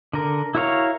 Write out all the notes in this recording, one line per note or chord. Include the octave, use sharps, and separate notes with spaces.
D3 A#4
E4 F#4 A#4 C#5 F5